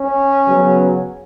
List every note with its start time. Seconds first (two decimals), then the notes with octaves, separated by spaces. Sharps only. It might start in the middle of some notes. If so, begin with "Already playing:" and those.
Already playing: C#4
0.47 C#3 F#3 B3